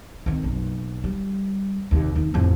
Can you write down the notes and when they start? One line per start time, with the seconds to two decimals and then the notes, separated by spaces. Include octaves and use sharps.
0.26 D#3 C4
0.43 F#1 B1
1.04 G3
1.91 D#2 C3
2.16 D#2 C3
2.34 A1 F2